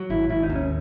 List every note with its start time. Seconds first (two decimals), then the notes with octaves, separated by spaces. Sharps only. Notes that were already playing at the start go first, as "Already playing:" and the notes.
Already playing: F#3
0.10 G#1 E4
0.29 G#1 E4
0.43 D#4
0.50 D#2
0.55 C#4